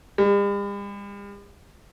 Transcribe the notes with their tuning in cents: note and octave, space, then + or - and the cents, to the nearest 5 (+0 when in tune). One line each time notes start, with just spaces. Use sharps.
G3 +45